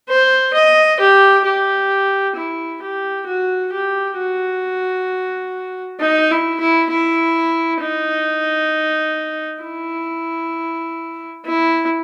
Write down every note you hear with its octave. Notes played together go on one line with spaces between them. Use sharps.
C5
D#5
G4
G4
E4
G4
F#4
G4
F#4
D#4
E4
E4
E4
D#4
E4
E4